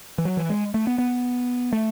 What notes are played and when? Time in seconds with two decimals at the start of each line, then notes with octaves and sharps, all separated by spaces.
0.18 E3
0.25 F#3
0.37 E3
0.50 G#3
0.74 A3
0.87 B3
0.98 B3
1.73 A3